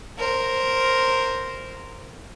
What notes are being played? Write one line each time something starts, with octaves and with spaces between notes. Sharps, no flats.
A#4 C5